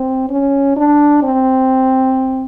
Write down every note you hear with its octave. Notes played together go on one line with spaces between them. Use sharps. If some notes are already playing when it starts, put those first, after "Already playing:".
Already playing: C4
C#4
D4
C4